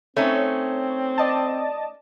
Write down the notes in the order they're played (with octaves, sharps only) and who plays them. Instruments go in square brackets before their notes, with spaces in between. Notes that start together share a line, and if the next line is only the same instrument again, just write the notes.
[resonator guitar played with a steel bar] A3 C#4 D#4 [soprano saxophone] C4 [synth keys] C#5
[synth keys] D5 D#5 A5